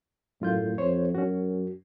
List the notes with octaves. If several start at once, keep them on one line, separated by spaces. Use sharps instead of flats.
F#2 A2 F4 G6
F2 C5 C#5
F#2 C#4 F#4